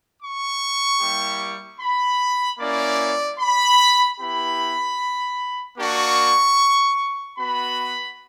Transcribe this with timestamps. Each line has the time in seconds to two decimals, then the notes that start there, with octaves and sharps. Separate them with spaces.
0.20 C#6
1.01 G3 A#3 E4 G4
1.80 B5
2.60 A#3 C#4 E4 D5
3.39 B5
4.19 B3 E4 G4 B5
5.78 A#3 D4 F#4 C#6
7.38 B3 F#4 B5